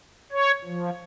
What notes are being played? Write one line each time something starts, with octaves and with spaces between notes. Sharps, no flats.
C#5
F3